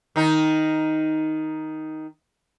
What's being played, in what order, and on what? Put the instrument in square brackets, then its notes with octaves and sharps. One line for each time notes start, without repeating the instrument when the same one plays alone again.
[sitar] D#3 D#4